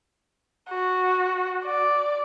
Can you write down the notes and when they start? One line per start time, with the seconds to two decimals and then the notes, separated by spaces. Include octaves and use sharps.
0.69 F#4
1.65 D5